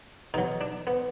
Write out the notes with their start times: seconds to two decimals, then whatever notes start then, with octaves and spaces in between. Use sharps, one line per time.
0.34 B2 F#3 D#4
0.61 D4
0.87 B3